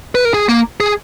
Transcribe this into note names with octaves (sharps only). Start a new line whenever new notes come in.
B4
A#4
G#4
A#3
G#4